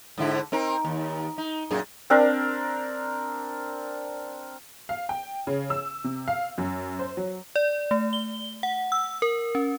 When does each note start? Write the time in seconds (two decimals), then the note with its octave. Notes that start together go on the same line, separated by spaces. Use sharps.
0.18 G#2 D3 E4
0.52 C4 D#4 A#4
0.85 D#2
1.38 D#4
1.71 F#2 A#2 G#4
2.10 C4 D4 A#4
4.89 F5
5.09 G5
5.47 C#3
5.70 E6
6.04 C3
6.28 F5
6.58 F#2
6.99 C5
7.17 F#3
7.56 D5
7.91 A3
8.13 G7
8.63 F#5
8.92 E6
9.22 A#4
9.55 C#4